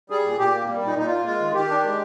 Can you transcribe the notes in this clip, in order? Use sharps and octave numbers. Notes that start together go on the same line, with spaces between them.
G3 G#4
A#2
A#2 G4
A#3
G3
A#2 D#4
A#2 D#4
F4
A#3
G#3 F4
D#3
D#3 G4
D4
G#3